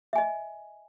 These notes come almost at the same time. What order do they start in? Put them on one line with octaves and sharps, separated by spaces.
E5 G#5 D#5